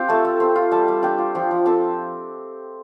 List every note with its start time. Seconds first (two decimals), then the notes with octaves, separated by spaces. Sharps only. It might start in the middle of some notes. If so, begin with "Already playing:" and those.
Already playing: C4 F4 G4 G5
0.08 A3 A4 A5
0.25 A3
0.40 C4
0.56 F4
0.71 G3 A4 A5
0.88 G3
1.03 D4 G4 G5
1.18 F4
1.35 F3 G4 G5
1.51 F3
1.66 C4 A4 A5